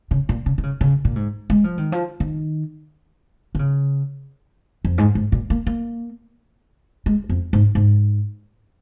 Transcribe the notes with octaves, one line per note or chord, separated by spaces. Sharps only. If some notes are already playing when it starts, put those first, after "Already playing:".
C#3
A#2
C#3
D#3
C#3
C#3
A#2
G#2
G#3
F3
D#3
F3
D#3
D#3
C#3
F2
G#2
G#2
A#2
A#3
A#3
G#3
F2
G#2
G#2